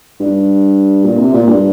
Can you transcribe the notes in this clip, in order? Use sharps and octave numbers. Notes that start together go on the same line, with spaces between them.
G2
A#2
C3
A#2
G2